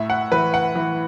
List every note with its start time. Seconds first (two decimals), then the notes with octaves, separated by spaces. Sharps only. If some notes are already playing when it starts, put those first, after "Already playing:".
Already playing: A2 E5
0.10 F#5
0.32 E3 B4
0.54 F#5
0.75 E3